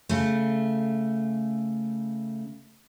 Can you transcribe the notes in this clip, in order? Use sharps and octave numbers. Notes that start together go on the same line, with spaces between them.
C#3 A3